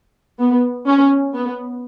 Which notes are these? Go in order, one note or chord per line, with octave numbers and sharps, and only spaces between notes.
B3
C#4
B3